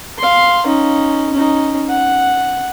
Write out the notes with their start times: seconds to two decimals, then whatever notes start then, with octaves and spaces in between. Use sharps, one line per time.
0.19 F5 C6
0.66 C#4 D#4
1.33 C#4 D#4
1.89 F#5